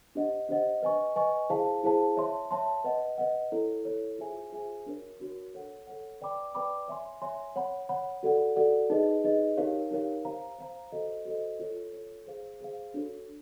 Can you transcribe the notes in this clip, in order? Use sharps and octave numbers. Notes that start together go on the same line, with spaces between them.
D4 G4 C5 D#5 F#5
D4 G4 C5 D#5 F#5
B4 D#5 G#5 C#6
B4 D#5 G#5 C#6
E4 G#4 C5 F5 A5
E4 G#4 C5 F5 A5
C#5 E5 A5 C6
C#5 E5 A5 C6
B4 D#5 F#5
B4 D#5 F#5
E4 A4 C#5
E4 A4 C#5
F4 G#4 C5 E5 G#5
F4 G#4 C5 E5 G#5
D4 F#4 A#4 C#5
D4 F#4 A#4 C#5
A4 C#5 F#5
A4 C#5 F#5
B4 D5 G5 B5 D6
B4 D5 G5 B5 D6
C#5 E5 G#5 C6
C#5 E5 G#5 C6
C#5 F#5 B5
C#5 F#5 B5
F#4 A4 D5 F#5
F#4 A4 D5 F#5
D#4 G#4 B4 D#5
D#4 G#4 B4 D#5
D#4 G4 A#4 C#5 F5
D#4 G4 A#4 C#5 F5
C5 F5 A#5
C5 F5 A#5
F#4 A4 C5 D#5
F#4 A4 C5 D#5
F4 A4 C#5
F4 A4 C#5
G#4 C5 F5
G#4 C5 F5
D4 F#4 A4 C#5